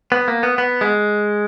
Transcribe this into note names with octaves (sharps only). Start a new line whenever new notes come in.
B3
A#3
B3
B3
G#3